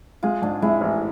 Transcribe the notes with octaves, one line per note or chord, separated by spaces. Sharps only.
G#3 F4
G#2 D4
G#3 E4
A1